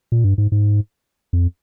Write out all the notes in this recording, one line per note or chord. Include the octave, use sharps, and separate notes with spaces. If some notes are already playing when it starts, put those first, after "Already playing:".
A#2
G2
G#2
G#2
F2